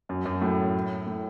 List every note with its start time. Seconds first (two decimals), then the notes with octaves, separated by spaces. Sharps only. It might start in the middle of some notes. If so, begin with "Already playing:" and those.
0.09 F#2
0.25 F#2
0.41 A2
1.06 A2